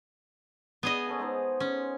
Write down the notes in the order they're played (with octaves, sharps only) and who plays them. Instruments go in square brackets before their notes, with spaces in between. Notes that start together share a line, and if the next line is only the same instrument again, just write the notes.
[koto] B3 G#4 D#5
[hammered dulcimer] C#4 A4 G#5
G#3 D#4 C5
[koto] C#4